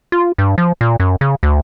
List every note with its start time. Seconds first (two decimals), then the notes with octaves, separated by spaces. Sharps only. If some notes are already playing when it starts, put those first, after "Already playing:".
0.12 F4
0.38 G2
0.58 F3
0.81 A#2
1.00 F#2
1.21 C#3
1.43 D2